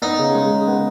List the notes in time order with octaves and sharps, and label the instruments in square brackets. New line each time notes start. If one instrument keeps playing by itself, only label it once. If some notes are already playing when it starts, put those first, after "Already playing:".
[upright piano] B3 [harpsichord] D#4
[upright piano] C#3
G#3
C#3
B3